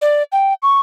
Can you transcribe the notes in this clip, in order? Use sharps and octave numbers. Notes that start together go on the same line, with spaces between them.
D5
G5
C#6